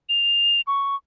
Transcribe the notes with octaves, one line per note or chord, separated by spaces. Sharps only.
F7
C#6